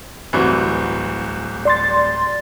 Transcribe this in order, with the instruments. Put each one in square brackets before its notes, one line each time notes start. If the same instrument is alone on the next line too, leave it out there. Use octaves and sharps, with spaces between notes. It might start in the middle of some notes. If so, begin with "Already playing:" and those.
[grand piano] D1 C2 E3
[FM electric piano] D5 C6 A6